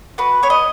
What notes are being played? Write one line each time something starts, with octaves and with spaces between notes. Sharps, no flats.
F#4 B4
B3 C#5
D#5